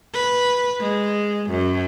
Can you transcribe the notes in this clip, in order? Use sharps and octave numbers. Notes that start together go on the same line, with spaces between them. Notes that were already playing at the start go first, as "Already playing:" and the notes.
B4
G#3
F#2